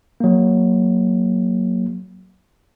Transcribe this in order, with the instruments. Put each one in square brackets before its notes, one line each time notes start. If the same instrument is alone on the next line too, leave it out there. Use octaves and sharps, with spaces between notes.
[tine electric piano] F#3 A#3